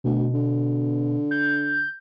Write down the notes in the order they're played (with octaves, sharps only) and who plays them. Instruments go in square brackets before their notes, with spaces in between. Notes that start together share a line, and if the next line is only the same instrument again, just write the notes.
[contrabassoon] D2 [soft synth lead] B2
[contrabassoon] D3
[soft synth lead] G6